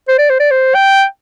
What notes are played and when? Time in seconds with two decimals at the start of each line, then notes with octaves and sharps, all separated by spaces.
0.08 C5
0.18 D5
0.30 C5
0.40 D5
0.51 C5
0.75 G5